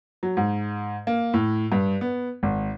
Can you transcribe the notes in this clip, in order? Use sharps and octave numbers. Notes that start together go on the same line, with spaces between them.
F#3
G#2
A#3
A2
G2
B3
G#1